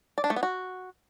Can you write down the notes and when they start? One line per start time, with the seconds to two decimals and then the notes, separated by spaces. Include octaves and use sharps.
0.18 D5
0.24 D4
0.30 A3
0.36 B3
0.43 F#4